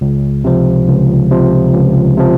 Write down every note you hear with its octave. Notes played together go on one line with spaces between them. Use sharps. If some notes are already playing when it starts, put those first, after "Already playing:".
C#2
C3 F3
C#2
C3 F3
C#2
C3 F3